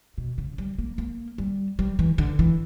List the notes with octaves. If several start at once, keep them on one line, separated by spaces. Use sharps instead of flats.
B2
C#3
G3
A#3
A#3
G3
G3
E3
D3
E3